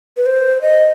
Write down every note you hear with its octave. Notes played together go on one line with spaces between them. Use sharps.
B4
C5
D#5